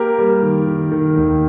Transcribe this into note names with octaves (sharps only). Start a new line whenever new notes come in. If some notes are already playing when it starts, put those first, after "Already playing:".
Already playing: A#3 G4 A#4
G3
D#3
D#3
D#3
D#2